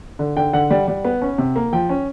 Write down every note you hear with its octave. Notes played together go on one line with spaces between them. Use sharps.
D3
D3 G5
D3 F#5
G3
G3
B3
C#4
C3
A#3
F3 G5
C#4